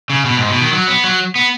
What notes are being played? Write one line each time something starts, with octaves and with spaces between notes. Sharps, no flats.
C#3
B2
G#2
B2
D#3
F#3
B3
F#3
B3